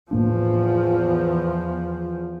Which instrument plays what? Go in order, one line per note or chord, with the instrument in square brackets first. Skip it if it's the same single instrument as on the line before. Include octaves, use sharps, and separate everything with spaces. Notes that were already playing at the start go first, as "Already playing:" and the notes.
[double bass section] E2 F3 [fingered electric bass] A2 A#3 D4